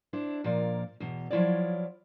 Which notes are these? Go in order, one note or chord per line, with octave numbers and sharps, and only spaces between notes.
D4 E4 C5
A#2 F3 A#4 D5
E2 B2
F3 F#3 E4 F4 C#5 D5